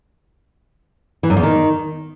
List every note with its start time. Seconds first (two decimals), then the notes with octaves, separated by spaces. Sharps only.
1.23 E3
1.30 F#2
1.37 E2
1.43 D#3